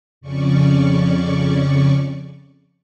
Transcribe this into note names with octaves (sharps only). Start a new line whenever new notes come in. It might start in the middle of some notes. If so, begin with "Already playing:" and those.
F2 C#3 C#4 D5 C#6